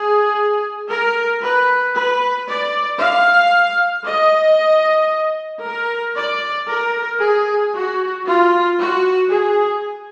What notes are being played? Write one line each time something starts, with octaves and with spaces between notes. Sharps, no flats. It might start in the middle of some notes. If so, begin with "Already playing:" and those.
Already playing: G#4
A#4
B4
B4
D5
F5
D#5
A#4
D5
A#4
G#4
F#4
F4
F#4
G#4